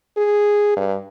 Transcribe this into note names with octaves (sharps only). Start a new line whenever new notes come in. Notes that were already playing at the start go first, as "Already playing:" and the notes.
G#4
G2